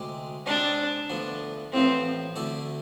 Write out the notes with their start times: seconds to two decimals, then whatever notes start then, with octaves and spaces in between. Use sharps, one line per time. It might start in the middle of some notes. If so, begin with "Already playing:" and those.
Already playing: D2 C3 G#3
0.46 C3 G#3 C4 D4
1.09 D2 D3 F3 B3
1.72 A1 A2 F3 B3 C4
2.36 D2 D3 A3 E4 A4